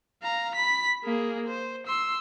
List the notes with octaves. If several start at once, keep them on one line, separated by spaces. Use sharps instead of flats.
F5 A#5
B5 B6
A#3 G#4
C5
C6 E6